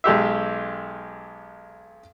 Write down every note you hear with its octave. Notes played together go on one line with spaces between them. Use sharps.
B1 G#3 G4 E5